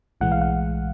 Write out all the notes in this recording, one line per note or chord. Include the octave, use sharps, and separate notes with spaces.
B1 A2 E3 G#3 F#5
F5
F#5